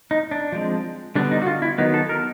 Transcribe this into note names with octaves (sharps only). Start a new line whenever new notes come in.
D#4
D4
F3 G#3 C4
D3 G3 B3 D4
D#4
F#4
F4
E4
D#3 F#3 B3 D#4
A4
A#4